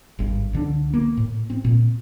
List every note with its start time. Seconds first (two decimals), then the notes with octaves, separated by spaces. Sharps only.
0.19 G#1 G2
0.53 C#2 D3 E3 D4
0.94 A#3
1.17 A2
1.50 C4
1.64 A#2